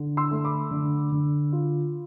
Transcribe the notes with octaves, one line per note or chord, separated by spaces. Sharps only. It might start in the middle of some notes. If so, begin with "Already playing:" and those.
Already playing: D3
C6 E6
A3
B5 D6
D3
D3
F4